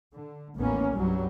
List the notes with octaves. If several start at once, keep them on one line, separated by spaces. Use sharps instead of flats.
D3
A1 D#2 A#3 B3 C#4
C2 G2 F#3 G3